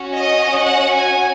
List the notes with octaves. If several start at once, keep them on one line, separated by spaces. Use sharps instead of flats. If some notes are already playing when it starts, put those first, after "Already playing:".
Already playing: C#4 F#4
D#5
F#5
G#5